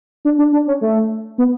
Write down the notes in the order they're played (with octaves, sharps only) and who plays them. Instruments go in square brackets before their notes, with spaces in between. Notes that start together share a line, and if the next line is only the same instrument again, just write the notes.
[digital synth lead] D4
D4
D4
C#4
A3
B3